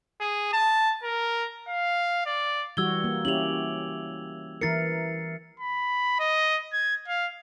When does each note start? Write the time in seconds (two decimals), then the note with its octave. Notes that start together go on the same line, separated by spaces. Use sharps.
0.21 G#4
0.53 A5
1.03 A#4
1.68 F5
2.26 D5
2.77 E3 G3 F#4 E6 G#6 G7
3.04 A#3
3.25 C#4 E4 G4 F7 F#7
4.61 E3 E4 A#4 A6 C7 C#7
5.60 B5
6.19 D#5
6.73 G#6
7.08 F5